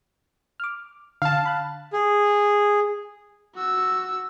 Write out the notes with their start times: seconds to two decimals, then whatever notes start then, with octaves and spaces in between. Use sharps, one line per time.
0.60 D6 F6
1.22 D3 F5 A5
1.46 B5 F#6
1.93 G#4
3.55 F#4 E6